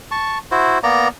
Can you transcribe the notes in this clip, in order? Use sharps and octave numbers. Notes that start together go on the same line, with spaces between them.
A5 C#6
E4 F#4 C5
A#3 B3 D5 A#5